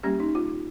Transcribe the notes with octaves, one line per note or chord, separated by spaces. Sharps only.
G3 A#3 C#4 G4
D#4
F4